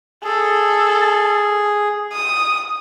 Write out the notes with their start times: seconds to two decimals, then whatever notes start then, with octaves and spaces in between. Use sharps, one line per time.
0.24 G#4 A4
2.12 D#6